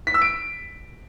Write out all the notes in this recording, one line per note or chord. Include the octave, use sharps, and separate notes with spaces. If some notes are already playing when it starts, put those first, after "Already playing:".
B6
E6
D7